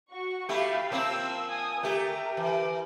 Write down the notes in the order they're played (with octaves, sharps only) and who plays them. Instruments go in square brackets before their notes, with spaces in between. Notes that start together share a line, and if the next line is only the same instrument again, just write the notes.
[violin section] F#4 C#6
[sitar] A3 E4 G4 [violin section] F5 B5
[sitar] F3 A#3 C4 [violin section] E6
[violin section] G#5 D#6
[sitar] A3 G4 [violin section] A#4
[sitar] E3